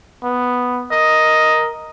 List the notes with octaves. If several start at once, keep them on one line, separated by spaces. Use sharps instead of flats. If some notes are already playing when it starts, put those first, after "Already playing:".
B3
A#4 D#5